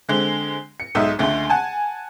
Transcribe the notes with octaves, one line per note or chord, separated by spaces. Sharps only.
D3 G#3 C4
C#7
B1 G#2 D#4 E5
C#2 D3 G#3 A3
F#5 G#5 A5